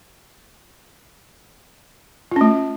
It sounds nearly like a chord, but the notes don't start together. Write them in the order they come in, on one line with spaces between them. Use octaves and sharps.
F4 C#4 A3